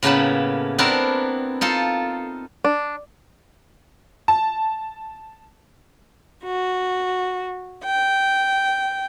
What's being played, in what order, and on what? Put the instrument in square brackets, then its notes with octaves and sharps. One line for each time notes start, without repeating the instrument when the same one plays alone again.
[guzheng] A2 C#3 A#3 B3 A5 B5
B3 C4 D4 E4 A#4 A5
D#4 F4 A4
[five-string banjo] D4
[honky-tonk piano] A5
[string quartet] F#4
G5